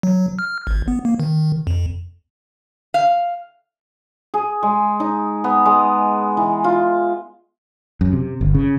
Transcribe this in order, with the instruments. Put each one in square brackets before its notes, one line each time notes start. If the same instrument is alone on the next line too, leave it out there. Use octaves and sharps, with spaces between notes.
[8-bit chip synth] F#3
F6
G#1
B3
A#3
D#3
F2
[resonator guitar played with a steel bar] F5
[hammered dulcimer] G#4
G#3
D#4
B3
G#3
E3
F4
[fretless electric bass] F#2
C3
G1
C#3